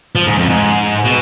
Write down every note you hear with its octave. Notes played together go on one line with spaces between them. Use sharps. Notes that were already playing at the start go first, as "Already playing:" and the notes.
F3
G#2
F2
G#2
B2